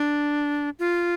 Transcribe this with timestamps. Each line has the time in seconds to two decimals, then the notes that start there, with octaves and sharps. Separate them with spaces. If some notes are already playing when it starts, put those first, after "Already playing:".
Already playing: D4
0.79 F4